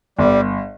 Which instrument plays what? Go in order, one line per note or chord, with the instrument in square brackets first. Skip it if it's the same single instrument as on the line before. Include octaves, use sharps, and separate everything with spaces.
[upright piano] G1 [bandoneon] G3